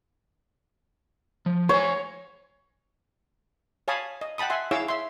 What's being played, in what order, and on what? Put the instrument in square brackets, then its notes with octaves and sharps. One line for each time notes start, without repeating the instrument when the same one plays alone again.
[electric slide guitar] F3
[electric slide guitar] C5 G#5 [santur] C#5
[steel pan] C#5 F5 G#5 A5 B5 D#6
D#5
F#5 G5 A5 B5 D#6
E5 F#5 G#5 C6
E4 G#4 C#5 F5 D6 E6
E5 C6